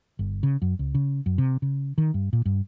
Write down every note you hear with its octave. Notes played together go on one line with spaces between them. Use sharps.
G1
C#3
F#2
C#2
C#3
F#2
C3
C#3
D#3
G2
A#2
G2